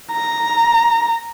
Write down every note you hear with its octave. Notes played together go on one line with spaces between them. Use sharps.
A#5